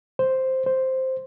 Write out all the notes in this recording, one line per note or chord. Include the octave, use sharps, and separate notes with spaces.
C5
C5